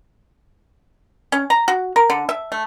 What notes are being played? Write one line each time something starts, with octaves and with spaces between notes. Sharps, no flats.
C#4
A#5
F#4
A#4
D3
E5
A3